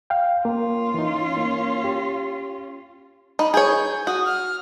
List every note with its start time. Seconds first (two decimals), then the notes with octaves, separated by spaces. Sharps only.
0.10 F5 G5
0.45 A#3 C#4 F4
0.94 E3 D#4
1.37 A#3
1.84 G4
3.39 D#4 B5
3.54 G#4 C#5 G6
4.07 F#4 D#6
4.25 F6